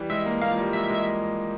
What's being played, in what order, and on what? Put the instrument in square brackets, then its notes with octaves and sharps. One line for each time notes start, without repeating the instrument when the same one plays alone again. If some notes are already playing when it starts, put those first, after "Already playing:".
Already playing: [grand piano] E3 G3
[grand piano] G#3 [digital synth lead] E5
[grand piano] A#3
[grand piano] A#3 [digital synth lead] F5
[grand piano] F3
G3
[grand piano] G#3 [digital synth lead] E5
[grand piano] G#3